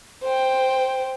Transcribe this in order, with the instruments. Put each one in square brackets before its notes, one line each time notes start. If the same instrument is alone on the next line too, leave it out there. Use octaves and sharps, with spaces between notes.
[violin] C5 G5